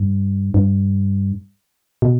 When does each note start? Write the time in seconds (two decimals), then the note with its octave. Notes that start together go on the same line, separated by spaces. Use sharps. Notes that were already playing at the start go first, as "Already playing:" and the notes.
Already playing: G2
0.54 G2
2.02 B2